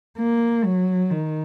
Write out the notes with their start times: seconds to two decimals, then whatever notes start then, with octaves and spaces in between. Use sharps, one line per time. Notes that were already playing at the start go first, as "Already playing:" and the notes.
0.18 A#3
0.64 F#3
1.11 D#3